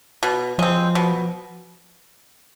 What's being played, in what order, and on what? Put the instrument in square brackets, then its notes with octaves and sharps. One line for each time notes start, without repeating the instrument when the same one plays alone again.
[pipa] B2
[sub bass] F3 [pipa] G#3 C4
[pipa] B2